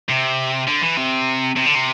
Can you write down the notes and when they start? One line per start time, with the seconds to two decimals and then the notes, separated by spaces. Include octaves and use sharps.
0.09 C3
0.68 D3
0.82 E3
0.97 C3
1.56 C3
1.66 D3
1.75 C3